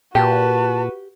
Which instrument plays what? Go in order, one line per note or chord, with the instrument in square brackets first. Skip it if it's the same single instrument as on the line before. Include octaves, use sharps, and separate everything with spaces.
[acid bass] A#2 [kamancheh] F#4 B4 [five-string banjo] G4 [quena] A5